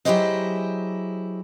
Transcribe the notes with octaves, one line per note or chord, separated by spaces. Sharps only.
F#3 E4 G4 G#4 C5 D#5